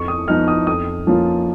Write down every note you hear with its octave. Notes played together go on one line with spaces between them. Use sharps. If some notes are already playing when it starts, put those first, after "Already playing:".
Already playing: F2 C#6
D#6
F3 B3 D#4 F6
D#6
F2 D#6
F3 A#3 C#4 F4